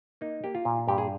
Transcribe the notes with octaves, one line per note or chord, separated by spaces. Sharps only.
A#3 D#4
A#3 G4
F4
A#2
G2 G4
G#4